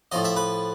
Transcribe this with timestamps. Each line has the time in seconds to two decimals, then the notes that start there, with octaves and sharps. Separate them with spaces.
0.12 A2 F3 D#5
0.24 E5
0.36 B4